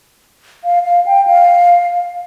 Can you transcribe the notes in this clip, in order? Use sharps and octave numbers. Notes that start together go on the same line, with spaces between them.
F5
F5
G5
F5